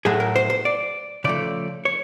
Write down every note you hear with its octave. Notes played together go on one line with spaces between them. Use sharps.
A2 F#3 A3 G#4
A#4
C5
C5
D5
C#3 F3 A3 D5
C#5